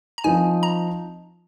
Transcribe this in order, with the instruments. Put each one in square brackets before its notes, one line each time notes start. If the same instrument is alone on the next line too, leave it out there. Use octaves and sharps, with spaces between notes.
[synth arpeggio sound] A#5
[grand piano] F3 C4 D#4 [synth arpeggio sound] G#5
[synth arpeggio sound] A#5